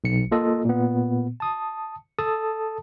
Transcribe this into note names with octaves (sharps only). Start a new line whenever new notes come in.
B1 C#7
A#3 F4 A4 D#5
A#2 B3
A5 D#6
A4 A5 D#6